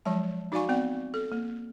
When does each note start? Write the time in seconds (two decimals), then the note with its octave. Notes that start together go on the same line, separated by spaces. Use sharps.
0.05 F3 F#3 G#3 A5
0.52 D#4 F#4 D5 F5 G#5 C#6
0.69 B3 C4 D5 F#5
1.14 A4
1.32 A#3